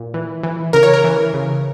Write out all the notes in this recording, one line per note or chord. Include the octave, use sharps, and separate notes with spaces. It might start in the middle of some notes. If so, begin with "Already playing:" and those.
Already playing: A#2
E3
E3
C#3 A#4
C#5
A#4
E3
C#3